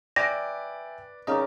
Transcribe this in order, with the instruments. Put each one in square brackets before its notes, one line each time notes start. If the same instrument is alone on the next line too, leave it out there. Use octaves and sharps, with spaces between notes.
[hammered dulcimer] B4 [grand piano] D5 [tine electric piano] E5 G5 G#5 [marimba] A#6
[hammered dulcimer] C#3 A#4 D5 [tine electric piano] D#4 D#5